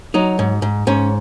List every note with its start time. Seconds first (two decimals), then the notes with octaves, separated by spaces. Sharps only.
0.14 F#3 D#4
0.39 G#2
0.62 G#2
0.87 G#2 C#4